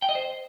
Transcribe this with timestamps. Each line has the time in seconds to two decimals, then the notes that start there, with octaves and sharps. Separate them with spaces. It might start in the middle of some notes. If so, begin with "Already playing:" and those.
0.02 G5
0.09 D#5
0.15 C5